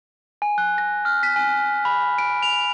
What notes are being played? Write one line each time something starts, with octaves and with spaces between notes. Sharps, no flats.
G#5
F#6
A#6
F6
B6
G#5
B5
D7
F7